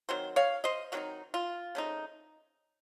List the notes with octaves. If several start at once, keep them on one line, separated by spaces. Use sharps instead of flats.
D#3 F#3 C4 C5
C#5 F5
C5 D#5
D#3 F#3 C4 D#4 F#4
F4
C#3 A3 C4 D#4